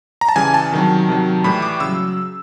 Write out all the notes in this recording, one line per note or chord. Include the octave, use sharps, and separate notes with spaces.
A#5
A5
C#3 E3 G3 G#5
A5
C3 D#3 F#3
C3 D#3 F#3
A2 E3 G3 B5
D6
C#3 F#3 E6